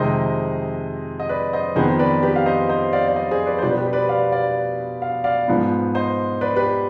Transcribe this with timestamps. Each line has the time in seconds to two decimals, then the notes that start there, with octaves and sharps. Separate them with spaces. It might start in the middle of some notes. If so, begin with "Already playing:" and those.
Already playing: F2 C3 D#3 G#3 C5 D#5
1.20 D#5
1.29 B4 D5
1.53 C5 D#5
1.76 F2 D#3 B3 G#4 C5
1.99 B4 D5
2.23 G4 B4
2.36 F5
2.46 C5 D#5
2.69 C5 D#5
2.93 D5 F5
3.08 D5
3.15 C5 D#5
3.31 G#4 C5
3.46 B4 D5
3.59 C5
3.62 B2 G3 B3 B4 D5
3.77 G4 B4
3.85 C5
3.93 B4 D5
4.09 D5 F5
4.31 D5 F5
5.02 F5
5.24 D5 F5
5.48 G#2 F3 B3
5.95 C5 D#5
6.41 B4 D5
6.56 G4 B4